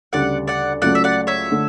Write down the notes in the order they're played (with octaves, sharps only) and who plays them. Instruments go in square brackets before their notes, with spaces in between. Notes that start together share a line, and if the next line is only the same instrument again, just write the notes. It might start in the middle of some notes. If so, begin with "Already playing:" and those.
[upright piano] D2 C#3 G3 [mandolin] D5 F#5
[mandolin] D5 F#5
[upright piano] C#2 C#3 F#3 A3 [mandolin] D5 F#5
[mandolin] E5
D5 F#5
C#5 E5
[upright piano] D3 A3